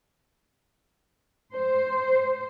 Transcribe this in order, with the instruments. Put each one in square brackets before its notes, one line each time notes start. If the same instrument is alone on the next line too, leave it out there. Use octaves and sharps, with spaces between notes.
[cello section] C5